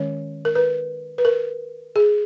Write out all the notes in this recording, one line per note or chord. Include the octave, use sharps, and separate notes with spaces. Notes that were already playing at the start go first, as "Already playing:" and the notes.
Already playing: D#3 G#3 C#4 C#5
A#4
B4
B4
A#4
G#4